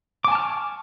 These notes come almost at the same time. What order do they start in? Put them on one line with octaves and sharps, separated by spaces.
D6 G#5 A5 F6 C#6